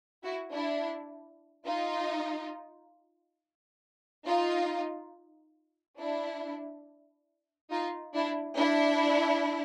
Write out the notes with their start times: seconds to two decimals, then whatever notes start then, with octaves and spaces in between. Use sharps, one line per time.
0.24 E4 F#4
0.52 D4 E4
1.67 D#4 F4
4.26 D#4 F4
5.98 D4 E4
7.70 D#4 F4
8.14 D4 E4
8.57 D4 E4